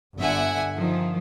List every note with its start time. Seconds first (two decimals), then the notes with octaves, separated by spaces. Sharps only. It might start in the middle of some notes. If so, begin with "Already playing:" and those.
0.18 G1 D3 E5 F#5 G#5
0.76 D#3 F3